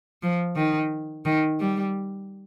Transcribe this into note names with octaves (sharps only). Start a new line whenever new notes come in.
F3
D#3
D#3
G3